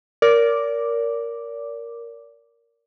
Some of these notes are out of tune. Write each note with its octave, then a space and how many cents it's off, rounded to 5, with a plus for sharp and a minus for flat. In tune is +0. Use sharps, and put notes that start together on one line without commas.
A#4 +0 D5 -35 D6 +0